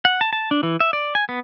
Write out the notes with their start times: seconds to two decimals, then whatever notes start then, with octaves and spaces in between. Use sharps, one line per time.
0.05 F#5
0.21 A5
0.33 A5
0.51 D4
0.63 E3
0.80 E5
0.93 D5
1.15 G#5
1.29 B3